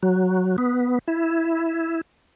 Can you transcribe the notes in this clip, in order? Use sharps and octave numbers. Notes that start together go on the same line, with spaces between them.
F#3
B3
E4